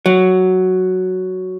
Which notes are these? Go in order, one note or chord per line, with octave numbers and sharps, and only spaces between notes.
F#3